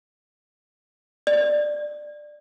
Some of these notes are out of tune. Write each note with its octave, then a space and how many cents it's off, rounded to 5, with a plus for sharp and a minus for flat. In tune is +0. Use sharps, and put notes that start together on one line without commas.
D5 +15